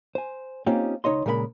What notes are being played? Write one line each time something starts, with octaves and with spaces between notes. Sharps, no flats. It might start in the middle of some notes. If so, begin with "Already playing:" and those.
C5 G#5
A#3 C4 C#4 D#4 F4 G4
C#2 D#4 C#5 D#5 C6
A#2 C#3 G#3 A#4 D#5 B5